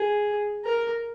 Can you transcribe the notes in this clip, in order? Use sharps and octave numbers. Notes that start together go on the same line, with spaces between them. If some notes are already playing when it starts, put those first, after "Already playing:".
Already playing: G#4
A#4